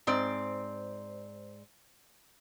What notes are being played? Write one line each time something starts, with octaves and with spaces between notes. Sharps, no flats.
G#2 C4 D5